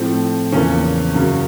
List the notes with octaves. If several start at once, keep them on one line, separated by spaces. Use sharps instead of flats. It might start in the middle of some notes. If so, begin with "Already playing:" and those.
Already playing: A2 F3 A3 C4
E2 C#3 F3 A#3 C#4
F#2 C#3 F#3